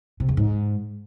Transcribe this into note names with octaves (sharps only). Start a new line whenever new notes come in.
C3
E2
G#2